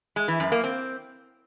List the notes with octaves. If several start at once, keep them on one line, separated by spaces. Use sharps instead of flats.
G#3
E3
F#2
A#3
C4